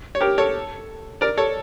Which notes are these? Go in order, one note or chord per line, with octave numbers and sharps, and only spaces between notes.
C#5
G4 A#4
A4 C#5
A#4 D5
A4 C#5